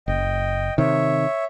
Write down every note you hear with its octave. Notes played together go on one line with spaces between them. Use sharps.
F#1 D#5 G5
C3 D#3 C#5 E5